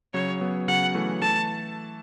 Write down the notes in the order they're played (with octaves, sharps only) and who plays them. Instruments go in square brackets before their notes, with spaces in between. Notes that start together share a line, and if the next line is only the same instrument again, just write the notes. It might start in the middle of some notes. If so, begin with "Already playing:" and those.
[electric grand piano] C#3 F#3 [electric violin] C#5
[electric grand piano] F#3 B3
[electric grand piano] C#3 F#3 [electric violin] F#5
[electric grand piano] E3 A3
[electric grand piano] E3 A3 [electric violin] A5